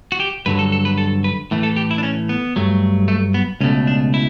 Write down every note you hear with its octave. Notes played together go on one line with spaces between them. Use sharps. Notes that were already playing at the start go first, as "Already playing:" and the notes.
F#4
G4
G2 D3 F#3 B4
A4
A4
B4
A4
B4
A2 E3 A3
A4
G4
E4
D4
C#4
B3
G2 F#3 A3
A3
B3
C#2 B2 A3 C#4
D4
E4